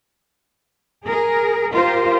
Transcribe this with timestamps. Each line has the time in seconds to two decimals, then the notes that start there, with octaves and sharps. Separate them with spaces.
1.04 G#4 A#4
1.73 F4 G4 A#4 C5